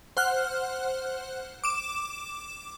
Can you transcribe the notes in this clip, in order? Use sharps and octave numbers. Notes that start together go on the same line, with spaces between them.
C5 F#5 F6 F#6
D6 E7